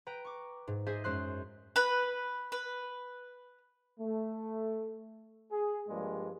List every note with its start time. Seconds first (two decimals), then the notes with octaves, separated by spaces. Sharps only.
0.07 B4 G5 A#5 D7
0.25 C#6 D6
0.67 G#2
0.87 G#4 C5 D#5 E5 G#5
1.04 F#2 G#3 C5 C6 F#6
1.76 B4 B5
2.52 B4
3.99 A3
5.51 G#4
5.88 G2 F3 G3 G#3 A#3